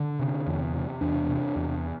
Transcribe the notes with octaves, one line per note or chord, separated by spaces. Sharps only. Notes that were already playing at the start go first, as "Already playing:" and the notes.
Already playing: D3
C3
E2
C3
E2 D4
C3
E2